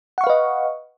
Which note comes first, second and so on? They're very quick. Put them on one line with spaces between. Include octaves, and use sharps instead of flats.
F#5 C#6 F5 B4 D#5